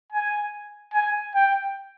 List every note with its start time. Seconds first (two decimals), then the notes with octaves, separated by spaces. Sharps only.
0.12 G#5
0.94 G#5
1.35 G5